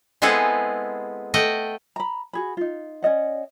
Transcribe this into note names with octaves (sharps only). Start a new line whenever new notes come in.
G#3 B3 C4 E4 G#4 A4
A3 D#5 F#5 G5
A#5 B5
F#4 G#4 B5
D#4 F4
C#4 D5 D#5 F#5